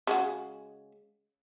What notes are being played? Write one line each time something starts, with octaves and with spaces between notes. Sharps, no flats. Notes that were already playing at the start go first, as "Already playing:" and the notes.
C#3 G#3 F#4